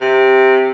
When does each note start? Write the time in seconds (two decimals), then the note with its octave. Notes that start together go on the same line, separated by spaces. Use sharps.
0.01 C3